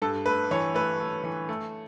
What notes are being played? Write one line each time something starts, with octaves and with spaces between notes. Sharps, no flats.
G2 A4
A3 B4
E3 C#5
A3 B4
A3
E3
A3